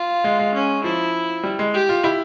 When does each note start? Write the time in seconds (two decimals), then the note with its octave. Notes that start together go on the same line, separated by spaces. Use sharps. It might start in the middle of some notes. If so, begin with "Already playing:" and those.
Already playing: F4
0.24 G#3
0.39 G#3
0.54 C#4
0.84 F3 E4
1.43 G3
1.59 G#3
1.74 G4
1.89 F4
2.04 E4